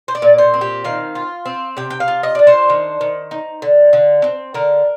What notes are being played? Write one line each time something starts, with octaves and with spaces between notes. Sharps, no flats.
C5
D5
A#2
C5
C4
G4
D#3 F5
F4
C4
C3 G5
G5
F5
F4
D#5
D4 D5
C5
D#3
D#3
D#4
D3
D3
C4
D3 A#4